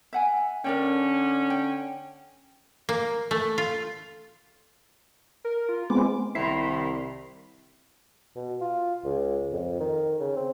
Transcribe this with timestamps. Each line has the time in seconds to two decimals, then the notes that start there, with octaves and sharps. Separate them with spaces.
0.13 E5 F#5 G#5
0.64 D3 C#4 A#4 D5 G5
1.50 G5
2.89 A#3
3.31 A3
3.58 F4
5.45 A#4
5.69 F4
5.90 G#3 B3 C4 D6
6.35 C2 D#3 E4 B5 C6
8.36 B2
8.61 F4
9.04 C#2
9.52 F2
9.80 D#3
10.20 C#3
10.36 C4